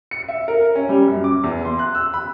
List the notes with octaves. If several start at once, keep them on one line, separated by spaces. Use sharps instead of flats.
C#7
E5
A#4
C#4
G3
F#2
D6
E2
C6
F#6
E6
B5